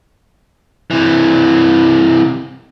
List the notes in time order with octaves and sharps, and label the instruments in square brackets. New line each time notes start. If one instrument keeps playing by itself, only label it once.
[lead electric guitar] C3 E3